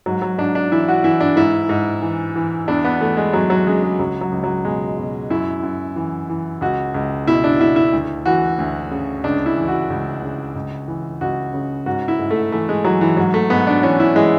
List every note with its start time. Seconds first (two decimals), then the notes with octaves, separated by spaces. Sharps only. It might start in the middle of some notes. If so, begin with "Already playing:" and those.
0.06 G#2 F#3
0.22 F#3
0.38 G#2 D4
0.55 D4
0.71 E3 E4
0.88 F#4
1.04 E3 E4
1.20 D4
1.36 G#2 E4
1.69 G#2
2.02 E3
2.36 E3
2.68 E2 D4
2.85 B3
3.00 E3 A3
3.17 G#3
3.33 E2 F#3
3.50 F#3
3.66 C#3 G#3
3.83 G#3
3.99 C#2 F#3
4.21 F#3
4.32 C#2
4.44 F#3
4.65 B2 G#3
4.98 B2
5.30 F#2 E4
5.63 F#2
5.96 E3
6.30 E3
6.61 C#2 F#4
6.94 C#2
7.27 B2 E4
7.44 D4
7.60 B2 E4
7.76 E4
7.93 D2
8.26 E3 F#4
8.59 D2
8.91 C#3
9.24 C#2 D4
9.46 E4
9.57 E3
9.68 F#4
9.90 C#2
10.23 C#3
10.56 C#2
10.88 E3
11.21 C#2 F#4
11.54 C#3
11.86 G#2 F#4
12.08 E4
12.19 G#2
12.31 A3
12.52 E3 A3
12.69 G#3
12.85 E3 F#3
13.01 E3
13.17 G#2 F#3
13.34 A3
13.50 G#2 B3
13.67 D4
13.83 E3 C#4
14.00 E4
14.16 E3 G#3